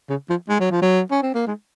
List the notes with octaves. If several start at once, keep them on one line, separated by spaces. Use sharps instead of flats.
C#3
F3
G#3
F#3
F3
F#3
C#4
C4
A#3
G#3